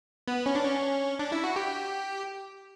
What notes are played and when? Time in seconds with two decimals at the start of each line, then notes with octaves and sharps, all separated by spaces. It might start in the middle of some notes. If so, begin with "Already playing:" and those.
0.28 B3
0.46 C#4
0.55 D4
0.64 C#4
1.19 D4
1.32 E4
1.44 F#4
1.56 G4